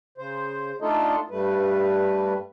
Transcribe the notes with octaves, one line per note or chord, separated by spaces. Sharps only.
C#3 C5
A3 D4 D#4 F4 A4 D#5
G2 G3 A3 B4